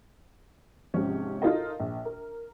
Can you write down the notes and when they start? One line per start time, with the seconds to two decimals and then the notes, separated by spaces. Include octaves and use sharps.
0.94 G#2 C3 F3 C#4
1.42 D#4 F4 A4 A#4 D#5
1.80 A#1
2.05 A#4